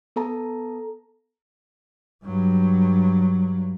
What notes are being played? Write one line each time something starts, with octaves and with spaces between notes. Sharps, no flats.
B3 A4 A5 A#5
G2 F#3